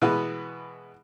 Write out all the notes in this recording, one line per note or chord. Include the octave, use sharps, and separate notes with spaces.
B2 E3 G#3 B3